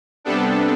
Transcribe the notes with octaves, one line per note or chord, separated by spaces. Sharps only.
C3 G3 B3 D4 A4